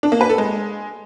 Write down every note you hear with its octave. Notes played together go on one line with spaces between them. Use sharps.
D4
A#3
B4
A4
G#3